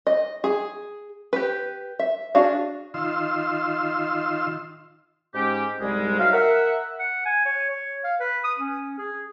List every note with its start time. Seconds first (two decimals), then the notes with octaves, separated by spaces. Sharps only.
0.07 D#5
0.44 G#4
1.33 G4 B4
1.99 E5
2.35 D4 F#4 G#4 F5
2.94 D#3 F4 C6 E6
5.34 G#2 G#3 C#4 G4
5.80 C2 G#2 G3 G#3
6.19 F#3 D#4 E5 F5
6.33 A#4 E5 F#5
6.99 F#5
7.25 G#5
7.45 C#5
7.69 C#5
8.04 F5
8.20 B4
8.44 D#6
8.59 C#4
8.98 G#4